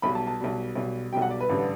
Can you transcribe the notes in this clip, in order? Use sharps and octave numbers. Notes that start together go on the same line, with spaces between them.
B1 B2 G3 B5
A5
A5
B1 B2 G3
B1 B2 G3
B1 B2 G3 G5
F#5
D5
B4
A1 G2 D3 G3